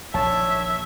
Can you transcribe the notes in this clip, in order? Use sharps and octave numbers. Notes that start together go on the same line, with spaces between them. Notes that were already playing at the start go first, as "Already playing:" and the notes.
A#1 D#2 A#2 C#5 E5 A5